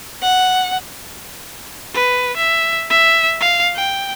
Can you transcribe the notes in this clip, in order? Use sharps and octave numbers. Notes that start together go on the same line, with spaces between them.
F#5
B4
E5
E5
F5
G5